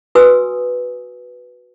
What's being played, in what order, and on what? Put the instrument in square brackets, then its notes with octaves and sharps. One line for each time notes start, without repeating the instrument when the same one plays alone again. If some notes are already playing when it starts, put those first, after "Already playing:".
[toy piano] F#4 B4 G#5 D#6 E6